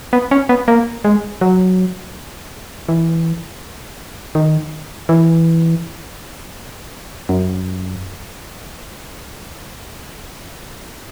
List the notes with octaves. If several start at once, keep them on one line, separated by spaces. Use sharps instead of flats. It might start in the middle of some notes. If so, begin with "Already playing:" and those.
B3
C#4
B3
A#3
G#3
F#3
E3
D#3
E3
F#2